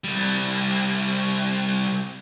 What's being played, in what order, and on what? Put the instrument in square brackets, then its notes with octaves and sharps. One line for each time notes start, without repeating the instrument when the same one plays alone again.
[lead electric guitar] C2 G3